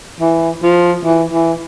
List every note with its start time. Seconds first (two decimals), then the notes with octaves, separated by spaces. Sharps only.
0.21 E3
0.63 F3
1.05 E3
1.33 E3